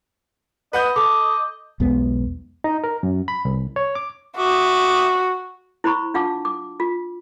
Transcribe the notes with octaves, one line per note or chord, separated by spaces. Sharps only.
B4 D#5 F#5 G6
A4 D6
B1 E2 G#3 B3
D#4
A#4
F#2
B5
C2
C#5
D6
F#4 E5 D6 D#6
E4 C5 A#5 B5 C#6
D4 F4 F5 F#5 A5 D6
D6
F4